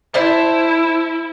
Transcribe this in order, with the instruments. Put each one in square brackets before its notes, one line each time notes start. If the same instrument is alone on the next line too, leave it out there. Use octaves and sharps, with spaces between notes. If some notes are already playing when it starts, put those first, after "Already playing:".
[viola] E4 [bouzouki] C5 E5 A5